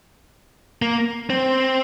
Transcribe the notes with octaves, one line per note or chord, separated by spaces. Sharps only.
A#3
C4